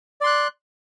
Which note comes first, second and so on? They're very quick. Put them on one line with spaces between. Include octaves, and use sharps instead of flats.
D5 C6 F#6